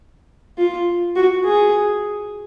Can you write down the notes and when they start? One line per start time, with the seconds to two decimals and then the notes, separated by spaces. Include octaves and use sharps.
0.58 F4
1.16 F#4
1.45 G#4